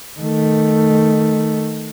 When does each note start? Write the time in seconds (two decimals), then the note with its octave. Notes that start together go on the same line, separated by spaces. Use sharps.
0.20 D#3 A3